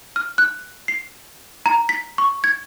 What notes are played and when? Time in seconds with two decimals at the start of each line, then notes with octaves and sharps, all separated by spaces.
0.16 F6
0.38 F#6
0.88 C7
1.66 A#5
1.89 B6
2.18 C#6
2.44 G#6